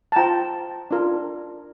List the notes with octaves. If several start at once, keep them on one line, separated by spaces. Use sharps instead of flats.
A5
F4 C5 G5 A#5
D4 F4 A#4